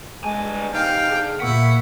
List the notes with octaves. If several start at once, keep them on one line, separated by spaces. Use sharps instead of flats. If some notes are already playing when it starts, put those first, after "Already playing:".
G2 G#3 G#5
C3 D#4 F5 G5
D3 G#4
A#2 A#3 E4 F#5 C#6 B6